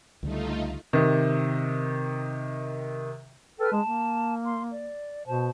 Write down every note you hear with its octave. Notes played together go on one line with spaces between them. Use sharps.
C#2 D3 G3 A3 D#4 F4
C3 D#3
A4 B4 G5 F6
G#3 A5
A#3
C6
D5
B2 C5 A5